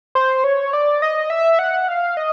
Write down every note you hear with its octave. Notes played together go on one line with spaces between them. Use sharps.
C5
C#5
D5
D#5
E5
F#5
F5
D#5